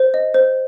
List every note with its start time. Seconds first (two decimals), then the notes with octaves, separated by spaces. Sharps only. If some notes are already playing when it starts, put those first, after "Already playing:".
Already playing: C5
0.14 D#5
0.34 C5